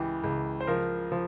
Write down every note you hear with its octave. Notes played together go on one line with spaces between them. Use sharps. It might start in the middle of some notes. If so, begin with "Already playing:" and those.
Already playing: C#2 E3 G4
C#2
C5
F3 A#4
F3